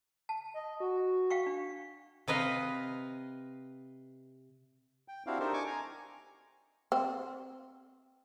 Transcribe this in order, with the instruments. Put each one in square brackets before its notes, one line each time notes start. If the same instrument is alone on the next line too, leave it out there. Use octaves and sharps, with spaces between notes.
[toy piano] A5
[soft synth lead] D#5
F#4
[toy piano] F5 G5 C#6
D4
[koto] C3 B4 D#5 F5
[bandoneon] G5
C4 D4 E4 F#4 G4 F5
D4 D#4 G4 A4 A#4 C5
G#5 C#6 D6
G#5 A#5
[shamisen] C4